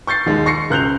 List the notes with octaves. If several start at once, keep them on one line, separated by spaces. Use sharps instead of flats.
C#6 G6 A6 C7
D#2 G#3
C#6 A#6 C7 C#7
C#2 F#6 G6 F7